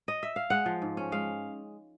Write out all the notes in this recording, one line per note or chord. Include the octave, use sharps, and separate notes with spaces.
D#5
E5
F5
G#3 F#5
F3
G#2
C#4
G#3 F5